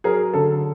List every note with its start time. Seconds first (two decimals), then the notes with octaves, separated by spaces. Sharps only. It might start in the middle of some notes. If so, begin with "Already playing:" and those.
0.04 F#3 G#4 A#4
0.34 D3 A4